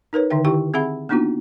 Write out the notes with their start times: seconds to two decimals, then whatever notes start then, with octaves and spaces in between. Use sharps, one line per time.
0.13 D#4 A#4 B4 C#5
0.30 D3 D#3 D#4 E5 G5
0.44 D#3 E4 G4 G5 C#6
0.74 C4 G#4 E5 F#5 B5
1.09 A#3 B3 D4 D#4 F4 F#4